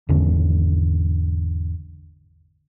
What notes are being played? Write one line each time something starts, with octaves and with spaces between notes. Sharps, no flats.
G#1 E2 D3 C#4